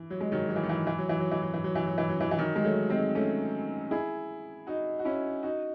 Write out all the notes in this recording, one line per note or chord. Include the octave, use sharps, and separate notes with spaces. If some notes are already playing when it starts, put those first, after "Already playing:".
Already playing: E3
F#3
G#3
D#3 F#3
F#3
E3
D#3
E3
E3
F#3
E3
F#3
E3
F#3
E3
F#3
E3
F#3
E3
F#3
E3
E3
D#3 F#3
G#3
F#3 A3
G#3 C4
A3 C#4
E4 G#4
D#4 F#4
F#4
C#4 E4
D#4 F#4